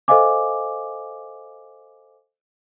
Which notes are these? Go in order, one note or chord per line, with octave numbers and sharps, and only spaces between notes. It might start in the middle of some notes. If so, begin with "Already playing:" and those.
A4 C5 D#5 F5 G#5 D6